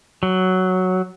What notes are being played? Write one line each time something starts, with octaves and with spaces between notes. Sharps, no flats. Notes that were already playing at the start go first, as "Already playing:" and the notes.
F#3